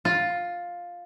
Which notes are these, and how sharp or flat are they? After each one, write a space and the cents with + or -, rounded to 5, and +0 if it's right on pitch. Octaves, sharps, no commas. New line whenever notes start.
F4 +10